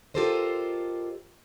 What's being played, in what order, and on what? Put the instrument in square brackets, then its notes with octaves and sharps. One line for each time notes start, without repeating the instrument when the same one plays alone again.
[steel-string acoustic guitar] F4 G4 A4 A#4 C5 D#5